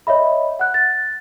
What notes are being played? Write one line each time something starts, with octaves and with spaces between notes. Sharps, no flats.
C#5 D#5 E5 B5
F#5 F#6
A6